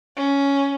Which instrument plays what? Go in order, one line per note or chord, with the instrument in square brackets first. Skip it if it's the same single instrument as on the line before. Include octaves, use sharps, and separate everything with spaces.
[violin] C#4